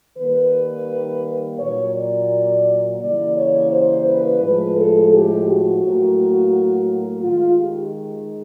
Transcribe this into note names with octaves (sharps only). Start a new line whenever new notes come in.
D#3 G3 A#3 B4
A#2 F#3 A#3 C#5
D5
C#3 E3 G3 A#3 D5
C#5
C5
B4
A2 F3 G#3 B4
A4
G4
F#4
A2 F#3 A#3
D#3 G#3 F4
G4